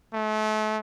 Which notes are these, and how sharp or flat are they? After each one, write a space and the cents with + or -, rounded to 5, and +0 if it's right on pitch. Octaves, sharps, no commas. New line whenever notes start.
A3 -35